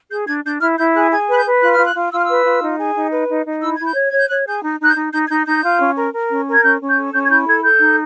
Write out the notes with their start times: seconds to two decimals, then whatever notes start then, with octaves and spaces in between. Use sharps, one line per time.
0.10 G#4 G6
0.27 D4 G#6
0.45 D4 G6
0.60 E4 F6
0.78 E4 G6
0.94 G#4 F#6
1.11 G#4 G#6
1.28 B4 F#6
1.37 G6
1.45 B4
1.61 F4 F#6
1.73 F6
1.78 F4
1.85 F#6
1.95 F4
2.12 F4 E6
2.19 F6
2.25 B4 E6
2.46 F4
2.62 D#4
2.78 G#4
2.96 D#4
3.12 B4
3.29 D#4
3.46 D#4
3.62 E4 E6
3.77 E4 G#6
3.87 G6
3.96 C#5
4.09 C#5 G#6
4.19 G6
4.30 C#5 F#6
4.46 G#4 G6
4.63 D#4
4.80 D#4 F#6
4.87 G6
4.96 D#4
5.13 D#4 G6
5.26 G#6
5.29 D#4 G6
5.46 D#4 G6
5.63 F4
5.80 C#4
5.96 A#4
6.14 A#4
6.30 C#4
6.48 A#4
6.54 G#6
6.63 C#4 G6
6.81 C#4
6.89 G6
6.97 A4
7.13 C#4 G6
7.26 G#6
7.30 E4 G6
7.47 A4 G#6
7.64 A4 G6
7.81 D#4